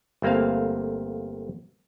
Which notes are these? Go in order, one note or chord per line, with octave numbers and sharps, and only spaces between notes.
G1 A3 A#3 C4 F5